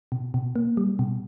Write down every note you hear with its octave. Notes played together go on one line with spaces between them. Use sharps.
B2
B2
A#3
G3
B2